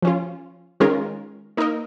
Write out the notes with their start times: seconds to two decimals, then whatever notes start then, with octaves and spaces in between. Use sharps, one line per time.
0.02 F3 C#4 F4
0.80 D#3 G#3 C#4 F4 A#4
1.57 A#3 D#4 A#4 D#5